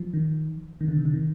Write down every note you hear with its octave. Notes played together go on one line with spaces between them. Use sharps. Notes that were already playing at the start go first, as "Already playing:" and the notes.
Already playing: F3
D#3
D#3
D3
C3
D3
D#3